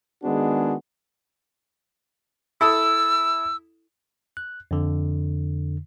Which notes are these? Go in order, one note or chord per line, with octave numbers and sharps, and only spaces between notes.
D#3 G#3 B3 D4 F#4 G#4
E4 A4 D#6 E6
F#6
F2 D3